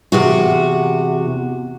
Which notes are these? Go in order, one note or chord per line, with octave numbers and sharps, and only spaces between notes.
E2 C3 F#4